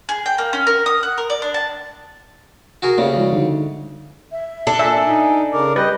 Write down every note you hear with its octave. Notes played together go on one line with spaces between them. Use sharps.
G#4
G5
A#3
C#4
A#4
D#6
F#5
A#4
D5
D4
A5
F#4 G#4 A#4
D2 C#3 A#3 G4 D5
F3 G#3 E4
D3 G3 D#4
E5
D4 A4
A#2 E5 G#5
D#4
C#3 A#4 D6
G3 G4 B4 D#5